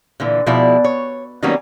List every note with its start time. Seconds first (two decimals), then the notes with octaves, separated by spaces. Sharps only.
0.20 A#2 D3 E3
0.47 B2 F3 G#3 E4 D5
0.84 C#5
1.43 D#3 F#3 G3 A#3 B3 C#4